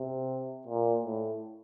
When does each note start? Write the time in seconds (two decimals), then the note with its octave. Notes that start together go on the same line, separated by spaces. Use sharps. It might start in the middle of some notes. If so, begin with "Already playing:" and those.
Already playing: C3
0.67 A#2
1.04 A2